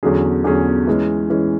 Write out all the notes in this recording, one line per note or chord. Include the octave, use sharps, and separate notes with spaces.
E2 D3 F#3 C#4 G#4
E2 D3 F#3 C#4 G#4
E3 G#3 C#4
E3 G#3 C#4